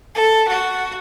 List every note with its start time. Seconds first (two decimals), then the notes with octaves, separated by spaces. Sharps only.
0.16 A4
0.47 F#4